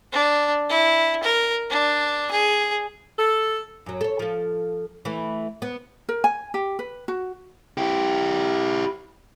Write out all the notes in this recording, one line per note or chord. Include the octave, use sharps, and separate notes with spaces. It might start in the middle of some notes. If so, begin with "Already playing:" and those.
D4
E4
A#4
D4
G#4
A4
F#2 F#3
A4 C#5
F3 A4
E3 A3
B3
A#4
G#5
G4
B4
F#4
E4 G4